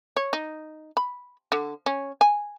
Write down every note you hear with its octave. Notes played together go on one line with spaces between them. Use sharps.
C#5
D#4
B5
D3
C#4
G#5